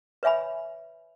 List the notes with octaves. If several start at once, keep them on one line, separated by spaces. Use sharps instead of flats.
B4 C#5 E5 G#5 B5